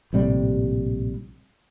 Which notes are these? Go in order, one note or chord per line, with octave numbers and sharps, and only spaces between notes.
A#1 A2 C3 G3